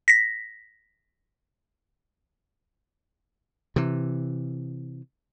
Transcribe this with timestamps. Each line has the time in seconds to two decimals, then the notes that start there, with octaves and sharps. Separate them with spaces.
0.08 A#6 B6
3.76 C3 E3